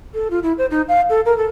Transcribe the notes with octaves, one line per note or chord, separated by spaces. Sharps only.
A4
F4
E4
C5
D#4
F5
A4
A#4
A4